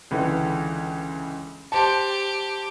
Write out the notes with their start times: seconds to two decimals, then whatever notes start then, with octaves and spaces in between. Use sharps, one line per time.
0.11 C#2 D3 E3
1.72 G4 C5 A5